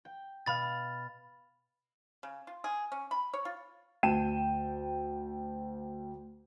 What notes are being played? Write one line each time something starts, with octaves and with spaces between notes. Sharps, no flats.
G5
B2 F5 B5 F6 A6
C#3
F4
G#4
C#4
B5
C#5
F4
D2 G5 A5 D#7 E7